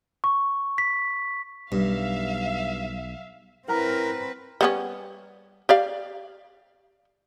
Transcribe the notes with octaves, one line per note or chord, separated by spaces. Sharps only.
C#6
B6
B1 G2 E5 F5
C4 E4 A#4 B4 F#5 A#5 F6
G3 B3 C#4
G4 D5 F5